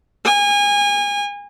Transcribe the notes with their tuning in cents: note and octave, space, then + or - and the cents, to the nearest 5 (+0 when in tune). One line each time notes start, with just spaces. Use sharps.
G#5 -30